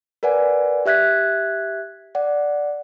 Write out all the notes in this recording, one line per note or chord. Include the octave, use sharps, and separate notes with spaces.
A#4 B4 D5 F#5 G#5
G4 E5 F#6 G#6 B6
D5 F#5